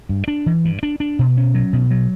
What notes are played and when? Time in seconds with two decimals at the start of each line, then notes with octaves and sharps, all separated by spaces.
0.09 G2
0.28 D4
0.46 E3
0.65 G2
0.83 D4
1.00 D4
1.19 B2
1.37 C#4
1.55 F#3
1.73 B2
1.91 F#3